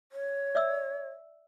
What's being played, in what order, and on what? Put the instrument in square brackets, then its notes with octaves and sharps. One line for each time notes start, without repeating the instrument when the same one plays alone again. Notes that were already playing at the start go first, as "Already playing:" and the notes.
[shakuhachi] C#5
[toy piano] D5 E5 E6